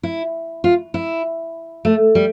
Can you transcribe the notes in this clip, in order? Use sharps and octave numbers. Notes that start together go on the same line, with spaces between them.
E4
F4
E4
A3
G3